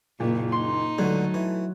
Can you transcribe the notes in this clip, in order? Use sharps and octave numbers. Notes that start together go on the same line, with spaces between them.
F#1 A#2
D#4 C6
C#2 D3 F#3 A3
E3